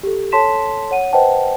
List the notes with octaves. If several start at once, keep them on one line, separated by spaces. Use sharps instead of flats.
G4 A4
A4 C#5 A5 C6 B6 E7
C#5 F#5 D#7
B4 C5 D#5 F#5 G5 A5